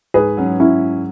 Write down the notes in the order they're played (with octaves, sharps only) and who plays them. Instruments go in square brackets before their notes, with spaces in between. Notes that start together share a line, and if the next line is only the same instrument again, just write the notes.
[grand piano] G#2 [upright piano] G#4 B4
[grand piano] F#3 C#4
[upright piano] C#4 E4